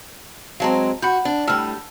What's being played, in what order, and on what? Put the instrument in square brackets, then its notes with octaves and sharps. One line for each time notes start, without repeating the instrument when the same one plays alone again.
[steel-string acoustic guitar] F#3 G#3 C4 [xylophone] F5 A5 A#5
[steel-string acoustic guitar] F#4 [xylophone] F#5 B5 G6
[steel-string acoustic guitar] D4
[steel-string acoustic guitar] A2 G3 [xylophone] A5 E6 F6